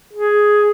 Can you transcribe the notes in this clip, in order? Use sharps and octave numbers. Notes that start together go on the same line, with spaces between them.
G#4